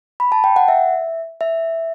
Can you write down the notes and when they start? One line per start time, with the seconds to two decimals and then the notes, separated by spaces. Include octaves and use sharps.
0.20 B5
0.32 A5
0.44 G5
0.56 F#5
0.68 E5
1.41 E5